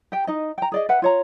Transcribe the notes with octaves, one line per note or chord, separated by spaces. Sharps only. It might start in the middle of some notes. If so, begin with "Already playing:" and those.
G4 G5
D#4 D#5
G5 A#5
G#4 D5 D#5
B4 E5 F#5
F4 C#5 A#5